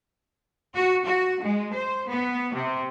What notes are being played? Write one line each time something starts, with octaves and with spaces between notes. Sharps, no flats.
F#4
F#4
G#3
C5
B3
C3